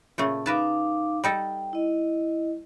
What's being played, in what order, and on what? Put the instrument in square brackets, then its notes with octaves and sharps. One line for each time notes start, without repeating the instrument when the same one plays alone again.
[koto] A#2 C#3 A3
[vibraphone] D#4 F5 D6 [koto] A#4 B4 A5
[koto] G3 D#4 A4 [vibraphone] G5
[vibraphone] E4 D#5